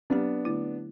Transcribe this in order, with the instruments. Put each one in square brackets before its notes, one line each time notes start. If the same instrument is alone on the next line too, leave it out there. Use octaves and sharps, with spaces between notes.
[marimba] F#3 C4 G4 [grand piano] B3 D4
[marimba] D3 A3 E4